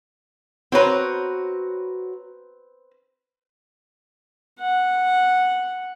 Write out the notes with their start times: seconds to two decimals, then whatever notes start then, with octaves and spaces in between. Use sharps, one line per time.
0.72 C4 F#4 B4 C#5 A#5
4.60 F#5